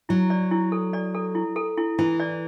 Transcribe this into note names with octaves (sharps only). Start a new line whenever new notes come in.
F#3 E4
D5
E4
A4
D5
A4
E4
A4
E4
E3 E4
D5